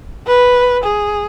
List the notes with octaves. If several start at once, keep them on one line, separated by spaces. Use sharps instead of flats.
B4
G#4